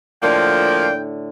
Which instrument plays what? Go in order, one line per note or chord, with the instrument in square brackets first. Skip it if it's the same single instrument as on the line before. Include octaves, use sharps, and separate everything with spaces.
[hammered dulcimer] A2 D3 F#5 [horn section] F3 A#3 [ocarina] D5 [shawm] G5